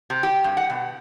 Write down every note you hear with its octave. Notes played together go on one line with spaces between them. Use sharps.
C3
G4
G2
F#5
B2